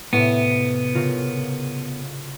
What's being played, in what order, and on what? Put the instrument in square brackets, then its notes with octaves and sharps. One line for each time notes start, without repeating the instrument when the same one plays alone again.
[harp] A2 C3 [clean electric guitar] B3
[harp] C#3 F4 A#4